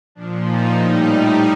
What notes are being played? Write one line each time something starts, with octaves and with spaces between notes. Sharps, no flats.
A#2 F3 D4
D#4
A2 G3 D#4